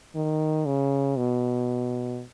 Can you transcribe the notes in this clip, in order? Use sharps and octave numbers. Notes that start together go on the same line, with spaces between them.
D#3
C#3
B2